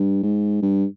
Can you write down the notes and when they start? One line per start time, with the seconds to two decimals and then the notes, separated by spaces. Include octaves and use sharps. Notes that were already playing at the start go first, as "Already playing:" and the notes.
Already playing: G2
0.23 G#2
0.62 G2